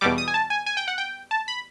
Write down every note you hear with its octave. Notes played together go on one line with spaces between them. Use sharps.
E2 B2 G3 D6
D#6
G#5
A5
G#5
G#5
G5
F#5
G5
A5
B5